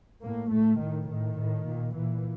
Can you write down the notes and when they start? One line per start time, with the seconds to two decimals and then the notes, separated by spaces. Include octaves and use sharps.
0.23 A2 A#3
0.52 A2 A3
0.81 A2 D#3
1.10 A2 D#3
1.38 A2
1.67 A#2
1.96 A#2 E3